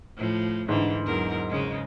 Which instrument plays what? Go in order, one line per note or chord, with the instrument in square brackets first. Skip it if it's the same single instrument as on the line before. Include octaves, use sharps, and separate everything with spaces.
[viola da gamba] A2 F3
[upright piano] G#2 [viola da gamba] D3 E3
[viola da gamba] E2 F#3 A#4
C#3 G#3